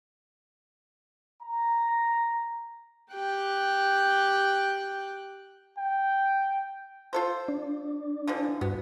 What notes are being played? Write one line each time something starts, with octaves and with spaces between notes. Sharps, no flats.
A#5
G4 G5 F#6
G5
F4 A4 C5
D4
D3 E3 F3
G2 B3 F#4